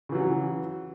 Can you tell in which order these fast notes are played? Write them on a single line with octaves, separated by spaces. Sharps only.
C#3 E3 F#3